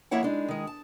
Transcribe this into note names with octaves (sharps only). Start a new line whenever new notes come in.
F2 A#3 E4 C#5 F#5
G#3 D4 D#4
D#3 G#3
A5